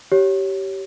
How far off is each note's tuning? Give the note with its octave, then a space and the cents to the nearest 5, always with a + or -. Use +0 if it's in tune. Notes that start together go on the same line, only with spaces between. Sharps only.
G4 -20 C#5 +0